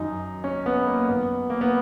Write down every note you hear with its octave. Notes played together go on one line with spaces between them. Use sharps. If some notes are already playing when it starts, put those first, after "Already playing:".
Already playing: F#2 D#3 D#4
C#4
B3
A#3
F#2 D#3 B3
A#3
B3